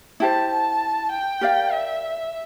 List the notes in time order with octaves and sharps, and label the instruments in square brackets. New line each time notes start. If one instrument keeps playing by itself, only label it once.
[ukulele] E4 G4 C5 [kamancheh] A5
[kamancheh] A5
G5
[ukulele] G4 A#4 D5 F5
[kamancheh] E5